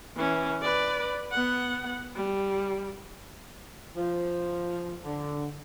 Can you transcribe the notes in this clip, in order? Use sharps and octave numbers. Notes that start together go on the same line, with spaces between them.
E3 C#4
B4 D5
B3 F#5
G3
F3
D3